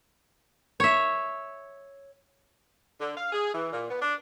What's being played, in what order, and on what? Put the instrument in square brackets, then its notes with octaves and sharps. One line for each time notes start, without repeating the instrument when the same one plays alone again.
[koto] C#5 E5
[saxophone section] D3
F5
G#4
E3
A#2
B3
D4